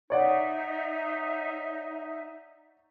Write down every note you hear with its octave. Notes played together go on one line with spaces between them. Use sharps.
D#4 C#5 D5 E5 F#5